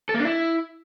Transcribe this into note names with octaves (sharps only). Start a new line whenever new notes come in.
A4
A#3
D4
E4